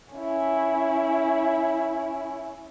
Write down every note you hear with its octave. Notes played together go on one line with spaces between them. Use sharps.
C#4 E4